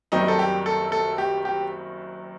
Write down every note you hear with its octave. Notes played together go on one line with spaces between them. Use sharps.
F#1 F#2 D#3 G3 C4 D#4
A4
G4
A4
A4
G4
G4